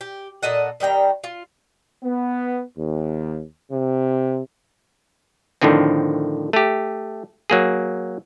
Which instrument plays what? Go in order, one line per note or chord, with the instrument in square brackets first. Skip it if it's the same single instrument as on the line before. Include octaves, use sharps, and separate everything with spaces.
[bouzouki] G4
A#2 A4 D#5 F#5
D#3 G3 G5 A#5
F4
[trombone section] B3
D#2
C3
[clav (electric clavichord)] A2 D3 D#3 F3 C4
A3 G4
F#3 A#3 G#4